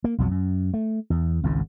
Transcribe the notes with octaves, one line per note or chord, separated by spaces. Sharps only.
A#3
B1 F2 F#3
F#2
A3
E2
G#1 C#2 G#2